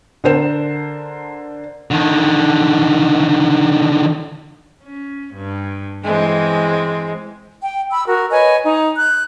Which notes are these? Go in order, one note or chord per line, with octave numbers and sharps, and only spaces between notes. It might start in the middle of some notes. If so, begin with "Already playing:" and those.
D3 D4 A#4 C5 E7
D3 D#3
C#4
G2
E3 G#3 C4
G5
B5 E6
F#4 A#4
B4 C#5 D#5 G#5
D#4
F#6 G6